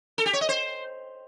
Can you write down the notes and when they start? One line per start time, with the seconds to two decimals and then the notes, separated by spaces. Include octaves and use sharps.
0.18 A4
0.26 G4
0.33 C#5
0.41 D#5
0.49 C5